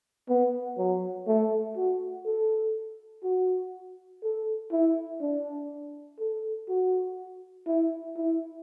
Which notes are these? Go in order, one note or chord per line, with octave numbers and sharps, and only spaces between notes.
B3
F#3
A3
F#4
A4
F#4
A4
E4
D4
A4
F#4
E4
E4